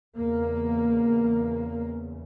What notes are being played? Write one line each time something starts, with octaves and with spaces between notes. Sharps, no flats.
E2 C#3 A#3